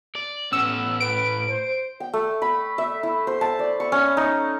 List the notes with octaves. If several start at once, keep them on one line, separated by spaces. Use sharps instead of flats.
D5
A2 B3 C#4 E6
B4 D7
C5
G5
A3
B5
E5
E4
C5
A5
D5
C#6
C#4
D#4